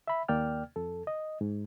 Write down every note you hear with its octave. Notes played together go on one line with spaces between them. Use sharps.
E5 B5
D#2 A#3 D5 G5 F6
F2 A4
D#5
G#2